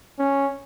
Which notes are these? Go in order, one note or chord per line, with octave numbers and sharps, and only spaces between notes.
C#4